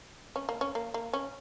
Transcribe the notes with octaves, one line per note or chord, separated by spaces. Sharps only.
C#4
A#3
C#4
A#3
A#3
C#4